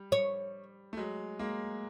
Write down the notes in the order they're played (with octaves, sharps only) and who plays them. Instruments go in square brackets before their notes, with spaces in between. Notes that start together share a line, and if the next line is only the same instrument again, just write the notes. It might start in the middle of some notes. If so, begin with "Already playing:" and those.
Already playing: [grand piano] G3
[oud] C#5
[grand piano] A3
F#3 G#3
G#3 A#3